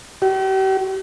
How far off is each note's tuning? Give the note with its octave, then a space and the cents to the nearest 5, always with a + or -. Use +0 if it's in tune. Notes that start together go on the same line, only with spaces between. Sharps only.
G4 -40